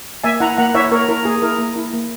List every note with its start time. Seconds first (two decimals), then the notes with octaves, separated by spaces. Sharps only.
0.24 A#3 E5 G#5
0.40 E4 F#5 A#5
0.57 A#3 F#5 A#5
0.74 E4 C#5 E5
0.92 A#3 A#4 C#5
1.08 E4 A#4
1.25 A#3 G#4
1.42 E4 A#4
1.59 A#3
1.76 E4
1.93 A#3